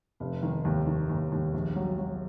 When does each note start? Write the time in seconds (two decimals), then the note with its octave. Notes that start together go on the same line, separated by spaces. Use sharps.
0.20 F1
0.43 D#3
0.65 D#2
0.87 D#3
1.09 D#2
1.32 D#2
1.54 A#1
1.76 F#3
1.98 F#3